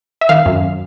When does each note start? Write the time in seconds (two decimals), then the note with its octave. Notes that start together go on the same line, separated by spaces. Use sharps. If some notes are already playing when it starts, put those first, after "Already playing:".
0.21 E5
0.29 D#3 F5
0.46 F#2